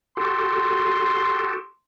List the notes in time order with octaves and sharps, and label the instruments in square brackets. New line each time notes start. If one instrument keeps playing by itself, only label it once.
[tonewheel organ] F#4 G4 A4 [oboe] C6